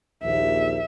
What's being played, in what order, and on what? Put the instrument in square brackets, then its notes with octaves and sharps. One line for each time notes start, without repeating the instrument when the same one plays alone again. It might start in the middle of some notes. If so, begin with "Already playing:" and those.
[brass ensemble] A#1 D#2 [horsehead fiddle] E5